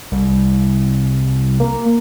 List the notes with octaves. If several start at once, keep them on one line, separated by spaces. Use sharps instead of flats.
C2
A#3